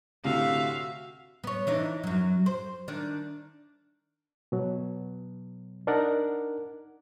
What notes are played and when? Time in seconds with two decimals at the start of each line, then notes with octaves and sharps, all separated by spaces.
0.24 D2 A2 C3 F#4 E5 F5
1.44 B3 C#5
1.67 E3 D4 D#4
2.03 F#2 F#3
2.46 C5
2.88 D#3 D4
4.52 B2 F#3
5.87 D4 D#4 A#4 D5 F#5